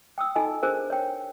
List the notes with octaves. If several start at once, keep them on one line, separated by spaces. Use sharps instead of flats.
G5 D#6 E6
D#4 A4 D#5 G#5 B5
D4 G#4 A#4 C5
C#5 G5